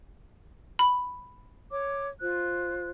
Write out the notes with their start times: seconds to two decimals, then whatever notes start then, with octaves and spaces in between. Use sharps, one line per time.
0.79 B5
1.71 C#5 D6
2.21 F4 C5 F#6